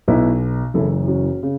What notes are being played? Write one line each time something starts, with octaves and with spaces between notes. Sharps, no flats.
B1 B2 B3 E4
F#1 F#2 E3 E4 A4
C#4 F#4
C#3